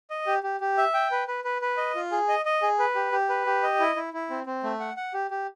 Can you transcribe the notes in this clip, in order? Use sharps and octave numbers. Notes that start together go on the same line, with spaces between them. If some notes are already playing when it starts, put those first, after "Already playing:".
D#5
G4
G4
G4
E5
G5
B4
B4
B4
B4
D#5
F4
G#4
D#5
D#5
G#4
B4
G4
G4
B4
G4
D#5
E4
E4
E4
C4
C4
A3
F#5
F#5
G4
G4